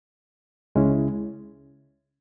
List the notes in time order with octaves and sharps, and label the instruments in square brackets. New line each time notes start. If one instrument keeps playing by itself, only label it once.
[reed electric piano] C#2 C#3 G#3 C#4 E4